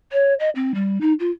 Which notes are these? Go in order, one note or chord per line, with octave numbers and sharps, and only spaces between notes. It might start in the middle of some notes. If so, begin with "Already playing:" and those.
C#5
D#5
C4
G3
D#4
F4